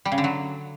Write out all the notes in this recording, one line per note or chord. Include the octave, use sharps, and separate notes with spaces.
G3
C#3
D3
F#3